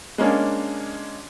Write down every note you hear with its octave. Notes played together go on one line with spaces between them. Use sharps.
G#3 A#3 C#4 D4